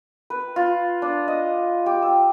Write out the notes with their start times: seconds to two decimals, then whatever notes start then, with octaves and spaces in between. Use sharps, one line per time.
0.30 B4
0.56 F4
1.02 D4
1.28 D#5
1.86 G4
2.02 E6